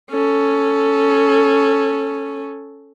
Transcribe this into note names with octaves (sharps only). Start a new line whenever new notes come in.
C#4 A4